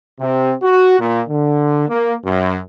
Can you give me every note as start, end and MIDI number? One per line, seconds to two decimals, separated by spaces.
0.20 0.52 48
0.63 0.98 66
1.00 1.21 46
1.30 1.89 50
1.89 2.14 58
2.25 2.58 42